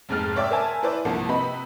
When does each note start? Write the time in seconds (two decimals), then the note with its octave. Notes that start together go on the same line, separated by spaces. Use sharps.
0.09 F1 F2 G#2 G#3 F6 A6
0.36 C#5 D5 E5 G5 D6 E6
0.51 A#4 C5 E5 G#5 A5
0.83 E4 B4 C5 D5
1.05 C2 G2 F3 A#3 C5 F#5
1.29 C3 B4 D#5 B5